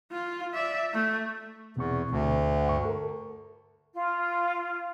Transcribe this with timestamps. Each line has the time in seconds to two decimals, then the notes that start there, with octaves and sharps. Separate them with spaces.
0.11 F4
0.54 D5 E5
0.93 A3
1.77 E2 B2 C4 C#6
2.11 D2
2.57 F#5
2.69 G2 C#6
2.85 A4 A#4
3.94 F4